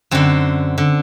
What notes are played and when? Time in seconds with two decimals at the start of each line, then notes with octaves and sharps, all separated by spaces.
0.11 F#2 D3 C4
0.78 D3